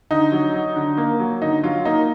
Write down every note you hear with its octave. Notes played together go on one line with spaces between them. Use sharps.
D3 D#4
F#3
F#3
D3
A#3
F#3
D3 D#4
F#3 F4
A#3 D#4